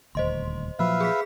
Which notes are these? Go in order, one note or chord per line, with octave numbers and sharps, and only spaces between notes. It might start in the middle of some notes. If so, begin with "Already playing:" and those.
D#1 D2 C5 D#5 C6
A#2 F3 F#3 B4 E5 F5 F6
G#4 B5 B6